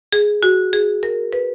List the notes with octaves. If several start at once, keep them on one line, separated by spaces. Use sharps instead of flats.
G#4
F#4
G#4
A#4
B4